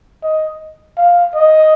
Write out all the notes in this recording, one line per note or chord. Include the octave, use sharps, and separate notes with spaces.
D#5
F5
D#5